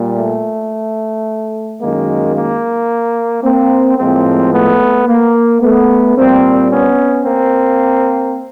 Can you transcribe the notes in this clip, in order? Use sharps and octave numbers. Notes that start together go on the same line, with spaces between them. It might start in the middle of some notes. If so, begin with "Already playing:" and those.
Already playing: A#2 G3
A3
F#2 D#3 G#3 A#3
A#3
A#3 C4
A2 F3 G#3 A#3 C4
A3 B3
A#3
A3 B3
A#2 G3 A#3 C4
B3 C#4
A#3 C4